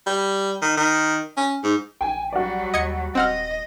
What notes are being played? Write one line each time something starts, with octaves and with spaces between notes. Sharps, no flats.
G3
D#3
D#3
C#4
G#2
A#1 G5 G#5
F#3 G3 F#4 D5
D#2 D#5 G#6 C#7
D#1 C4 D#5 F#5 F6